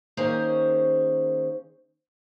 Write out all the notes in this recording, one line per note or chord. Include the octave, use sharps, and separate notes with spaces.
D#3 A#3 C#4 G#4 C5 C#5